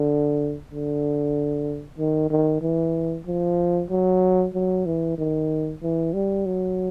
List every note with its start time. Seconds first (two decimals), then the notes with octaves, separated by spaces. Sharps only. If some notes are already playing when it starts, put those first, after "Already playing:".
Already playing: D3
0.70 D3
1.99 D#3
2.30 D#3
2.62 E3
3.27 F3
3.90 F#3
4.54 F#3
4.86 E3
5.18 D#3
5.83 E3
6.14 G3
6.46 F#3